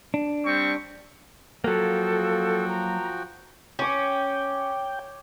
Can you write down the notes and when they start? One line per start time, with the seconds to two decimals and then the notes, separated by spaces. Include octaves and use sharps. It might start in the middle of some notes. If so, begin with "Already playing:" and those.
0.14 D4
0.46 G3 C4 C#6
1.64 F3 F#3 A#3 F#4 A4 G5
2.69 A#5
3.79 C#4 C#5 G5 D6